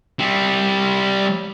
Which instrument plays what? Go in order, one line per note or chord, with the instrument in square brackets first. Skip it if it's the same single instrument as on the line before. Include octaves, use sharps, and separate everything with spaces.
[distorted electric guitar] G3 C4